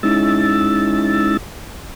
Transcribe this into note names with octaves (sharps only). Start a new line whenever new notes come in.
G#3 C#4 D#4 E4 E6 A6